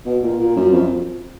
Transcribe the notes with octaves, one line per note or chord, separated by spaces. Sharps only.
B2
A#2
A#2
F#2
F2